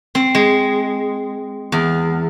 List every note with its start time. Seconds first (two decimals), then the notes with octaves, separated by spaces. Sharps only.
0.15 C4
0.35 G#3
1.72 E2